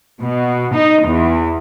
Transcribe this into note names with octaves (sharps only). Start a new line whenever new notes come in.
B2
D#4
E2